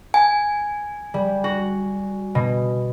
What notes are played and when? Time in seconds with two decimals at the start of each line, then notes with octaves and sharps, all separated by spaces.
0.14 G#5
1.14 G3
1.44 F#4
2.35 B2